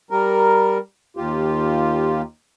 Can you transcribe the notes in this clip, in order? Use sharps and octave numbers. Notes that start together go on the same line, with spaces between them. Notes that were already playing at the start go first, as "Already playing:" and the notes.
G3 A#4
D#2 F4 G4